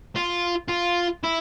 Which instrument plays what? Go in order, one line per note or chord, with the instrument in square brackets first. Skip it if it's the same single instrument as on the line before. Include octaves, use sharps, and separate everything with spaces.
[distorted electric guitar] F4
F4
E4